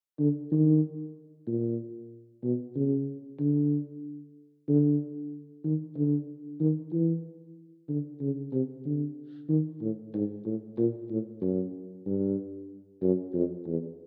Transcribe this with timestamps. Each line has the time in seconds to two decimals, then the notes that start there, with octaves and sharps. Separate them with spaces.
0.19 D3
0.52 D#3
1.47 A#2
2.44 B2
2.76 C#3
3.40 D3
4.68 D3
5.64 D#3
5.96 D3
6.61 D#3
6.92 E3
7.89 D3
8.21 C#3
8.53 C3
8.85 D3
9.49 D#3
9.82 A2
10.14 G#2
10.45 A2
10.78 A#2
11.10 A2
11.42 F#2
12.06 G2
13.02 F#2
13.34 F2
13.67 E2